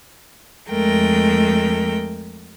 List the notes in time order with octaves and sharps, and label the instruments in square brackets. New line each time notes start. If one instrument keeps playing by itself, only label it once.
[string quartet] F2 G#3 A3 A#4 G5